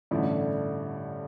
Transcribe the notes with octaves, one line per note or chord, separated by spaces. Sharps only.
A1 G2 D3 A3 E4